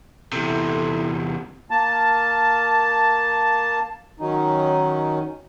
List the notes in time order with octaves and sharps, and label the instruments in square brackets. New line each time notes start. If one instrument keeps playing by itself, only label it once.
[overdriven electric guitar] E2 C3 [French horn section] E4 A4
[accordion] A#3 A5
[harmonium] D#3 F#3 C#4 D#4